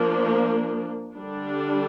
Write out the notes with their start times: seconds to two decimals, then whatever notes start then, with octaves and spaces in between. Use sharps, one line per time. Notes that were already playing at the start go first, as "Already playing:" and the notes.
Already playing: F3 A#3 D4
1.18 D3 G3 D4